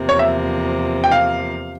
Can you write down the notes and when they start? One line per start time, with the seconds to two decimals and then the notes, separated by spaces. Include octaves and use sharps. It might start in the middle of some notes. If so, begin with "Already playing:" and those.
Already playing: E2 C3 F3 A#3
0.09 C#5
0.19 E5
1.04 G5
1.11 F5